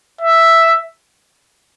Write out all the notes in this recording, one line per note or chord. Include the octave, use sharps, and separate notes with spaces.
E5